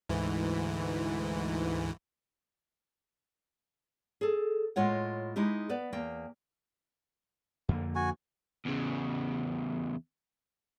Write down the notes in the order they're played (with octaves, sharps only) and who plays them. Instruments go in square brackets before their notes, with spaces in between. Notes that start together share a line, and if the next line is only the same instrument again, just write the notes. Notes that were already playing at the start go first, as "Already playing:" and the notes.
[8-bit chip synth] D2 G#2 E3
[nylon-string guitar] G#4 A4
A2 G#3 F4 C#5 F#5
G#3 D#4 E4 G4
B3 B4 D5
E2 A#3 G5
[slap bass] F2 D3 A#3
[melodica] F#4 G#5
[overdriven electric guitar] E2 C#3